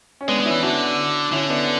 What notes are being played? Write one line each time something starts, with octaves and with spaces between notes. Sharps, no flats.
C#4
G#3 B3 D4
G#3
C#4 E4
E3
D3 D4 F#4
D3 C#4 E4
B3 D4